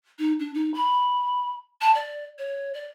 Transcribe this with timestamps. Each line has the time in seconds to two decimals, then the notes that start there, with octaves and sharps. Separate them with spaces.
0.19 D#4
0.39 D4
0.54 D#4
0.74 B5
1.81 A5
1.95 D5
2.38 C#5
2.74 D5